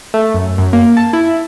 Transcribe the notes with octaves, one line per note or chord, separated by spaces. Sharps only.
A3
F#2
F#2
A#3
A5
E4